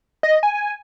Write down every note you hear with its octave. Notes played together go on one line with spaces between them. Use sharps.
D#5
G#5